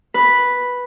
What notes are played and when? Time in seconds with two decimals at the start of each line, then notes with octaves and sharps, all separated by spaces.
0.14 B4